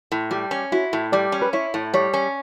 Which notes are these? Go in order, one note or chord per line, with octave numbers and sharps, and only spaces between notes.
A2
G3 G4
C#4
E4 F#4
A2
G3 D5
C#4
B4
E4 C#5
A2
G3 C#5
C#4